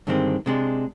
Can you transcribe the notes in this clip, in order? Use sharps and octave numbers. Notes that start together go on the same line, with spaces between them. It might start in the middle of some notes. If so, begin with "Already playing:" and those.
G2 D3 D#3 G#3 C4
C3 G#3 D4